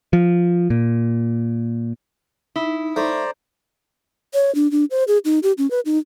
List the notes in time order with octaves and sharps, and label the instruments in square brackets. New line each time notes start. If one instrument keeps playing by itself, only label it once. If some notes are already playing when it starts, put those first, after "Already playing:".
[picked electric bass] F3
A#2
[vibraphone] D#4 [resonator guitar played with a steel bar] E4
[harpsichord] A3 [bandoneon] C5 D5 A#5
[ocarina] C#5
D4
D4
C5
G#4
D#4
G4
C#4
B4
D#4